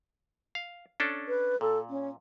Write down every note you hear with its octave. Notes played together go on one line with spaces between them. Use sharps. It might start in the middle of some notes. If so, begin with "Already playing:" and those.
F5
C#4 D4 A4
B4
A#2 A4
C#4